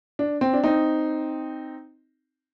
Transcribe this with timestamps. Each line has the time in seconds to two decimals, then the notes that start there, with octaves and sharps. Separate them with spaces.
0.19 D4
0.41 C4
0.53 D4
0.64 C4 D#4